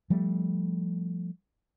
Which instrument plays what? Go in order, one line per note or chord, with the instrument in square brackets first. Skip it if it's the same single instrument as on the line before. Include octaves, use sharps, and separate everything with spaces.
[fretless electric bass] F3 G3 A3